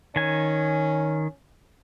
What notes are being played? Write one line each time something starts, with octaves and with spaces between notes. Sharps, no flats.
D#3 C#4 G#5